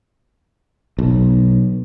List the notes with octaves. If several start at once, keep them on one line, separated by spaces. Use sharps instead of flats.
B1